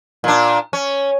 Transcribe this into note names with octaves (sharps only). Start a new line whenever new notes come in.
A#2 D4
C#4